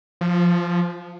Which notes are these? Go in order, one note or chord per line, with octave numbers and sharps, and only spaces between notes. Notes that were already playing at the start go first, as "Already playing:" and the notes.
F3